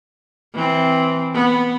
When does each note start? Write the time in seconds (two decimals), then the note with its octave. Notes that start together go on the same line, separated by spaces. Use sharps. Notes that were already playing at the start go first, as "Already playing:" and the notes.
0.55 E3 C4
1.34 B3